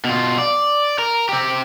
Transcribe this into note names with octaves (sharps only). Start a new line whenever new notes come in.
B2 F4
D5
A#4
C4 G4